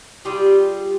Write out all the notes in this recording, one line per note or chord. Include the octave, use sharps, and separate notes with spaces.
G3 F4 G4 G#4